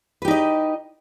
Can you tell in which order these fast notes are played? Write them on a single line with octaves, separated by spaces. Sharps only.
B4 G4 D#4 D#5